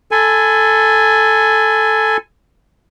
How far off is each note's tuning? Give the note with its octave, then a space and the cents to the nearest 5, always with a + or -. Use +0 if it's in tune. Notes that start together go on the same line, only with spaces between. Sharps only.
A4 +0 G#5 +0 B5 +40